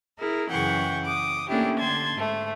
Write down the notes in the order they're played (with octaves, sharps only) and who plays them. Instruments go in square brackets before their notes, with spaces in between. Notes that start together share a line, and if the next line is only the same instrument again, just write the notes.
[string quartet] E4 G#4 A#4
F#2 C#3 E3 F#5 G5 C#6
D6 D#6
A3 A#3 C#4 D4 E4 G4
D3 A5 C6 G#6
G#2 A3